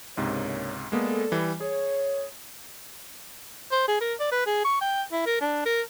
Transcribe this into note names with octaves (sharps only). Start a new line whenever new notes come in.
C#2 G#2 C3 A#3 D4 C#5
G#3 A#3 B3 A4 D5
E3 G3
G#4 C#5
C5
G#4
A#4
D5
B4
G#4
C#6
G5
E4
A#4
D4
A#4